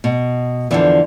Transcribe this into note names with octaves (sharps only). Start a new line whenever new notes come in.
B2
E2 D3 E3 F3 D5 E5